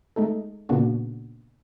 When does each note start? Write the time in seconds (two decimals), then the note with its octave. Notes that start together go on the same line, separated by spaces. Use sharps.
0.16 G#3 A3 D#4 A4
0.69 A#2 C#3 A#3 B3 D4 F#4